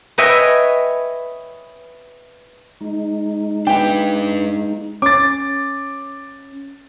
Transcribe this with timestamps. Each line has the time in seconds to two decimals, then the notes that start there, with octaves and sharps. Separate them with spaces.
0.18 B4 C#5 D#5 E5 G5 G#5
2.81 G#3 D#4
3.67 D4 B4 G5
5.02 C#4 D6 A6